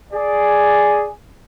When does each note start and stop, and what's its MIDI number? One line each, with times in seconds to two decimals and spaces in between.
0.13 1.09 68
0.13 1.09 74